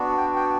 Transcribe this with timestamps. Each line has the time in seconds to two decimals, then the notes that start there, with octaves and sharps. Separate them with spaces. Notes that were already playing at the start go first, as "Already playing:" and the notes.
Already playing: B3 D4 F#4
0.18 G5
0.36 G5